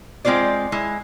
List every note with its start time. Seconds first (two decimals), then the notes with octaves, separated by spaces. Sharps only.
0.25 G#3 C4 F4 C5 D5
0.72 G#3 E4